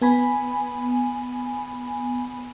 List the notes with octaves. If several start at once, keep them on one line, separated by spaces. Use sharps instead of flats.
B3 G#5 B5